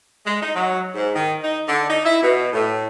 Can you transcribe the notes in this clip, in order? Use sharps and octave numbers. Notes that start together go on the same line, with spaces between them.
G#3
D#4
F#3
G#2
D#3
D#4
D3
D#4
E4
B2
A2